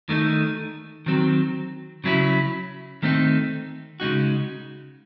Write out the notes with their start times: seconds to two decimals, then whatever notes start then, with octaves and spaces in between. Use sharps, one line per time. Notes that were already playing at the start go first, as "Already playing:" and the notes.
0.09 D#3 A3 D#4
1.06 D#3 F#3 C4
2.04 C#3 F#3 C#4 E4
3.02 D#3 A3 C4 D#4
4.00 C#3 G#3 D#4 F#4